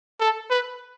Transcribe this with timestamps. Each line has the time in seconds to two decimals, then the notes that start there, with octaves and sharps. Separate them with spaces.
0.20 A4
0.50 B4